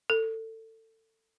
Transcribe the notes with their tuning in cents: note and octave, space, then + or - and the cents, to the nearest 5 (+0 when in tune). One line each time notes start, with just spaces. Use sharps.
A4 +25